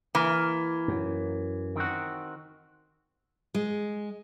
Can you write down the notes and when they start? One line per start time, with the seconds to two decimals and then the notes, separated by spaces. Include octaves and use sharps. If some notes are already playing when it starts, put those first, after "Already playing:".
0.15 E3 A#3 A#4
0.88 F#2
1.76 D#3 C4 F#4
3.54 G#3